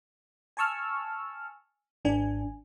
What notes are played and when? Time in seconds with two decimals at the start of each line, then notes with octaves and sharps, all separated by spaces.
0.57 G#5 A5 C#6 E6 F6
2.05 G#1 D4 G#5